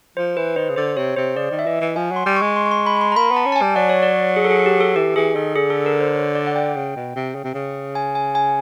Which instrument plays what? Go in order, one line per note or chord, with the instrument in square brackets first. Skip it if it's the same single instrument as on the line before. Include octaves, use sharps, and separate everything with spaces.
[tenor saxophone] F3 [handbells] C5
[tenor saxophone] E3 [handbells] B4
[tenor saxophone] D#3 [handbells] C5
[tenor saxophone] C#3
[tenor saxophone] D3 [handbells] C5
[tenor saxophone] C3 [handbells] C#5
[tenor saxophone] C3 [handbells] C5
[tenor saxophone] C#3 [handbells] D5
[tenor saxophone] D#3
[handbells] E5
[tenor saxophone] E3 [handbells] D#5
[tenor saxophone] E3
[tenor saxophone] F3 [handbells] G#5
[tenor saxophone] F#3 [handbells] C6
[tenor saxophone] G3
[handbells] C#6
[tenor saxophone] G#3
[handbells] C6
C#6
C6
B5
B5
C6
A#5
[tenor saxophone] A#3 [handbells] B5
[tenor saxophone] B3
[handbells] A5
[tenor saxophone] C#4
[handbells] A5
G#5
[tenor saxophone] G3
[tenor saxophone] F#3 [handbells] D5
[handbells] C#5
D5
G#4
A4
G#4
G4
A4
[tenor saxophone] E3 [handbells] G4
[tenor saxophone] E3 [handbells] G#4
[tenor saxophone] D#3 [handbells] A4
[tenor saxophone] D3 [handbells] G#4
[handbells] A4
A#4
C5
C#5
D5
F#5
G5
[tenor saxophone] C#3
B2
C3
C#3
C3
C#3
[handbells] G#5
G#5
G#5